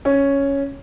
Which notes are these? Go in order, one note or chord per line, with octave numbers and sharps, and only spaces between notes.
C#4